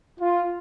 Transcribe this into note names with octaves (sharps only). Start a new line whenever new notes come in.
F4